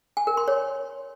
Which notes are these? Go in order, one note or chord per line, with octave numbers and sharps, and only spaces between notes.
G#5
A#4
C6
C#5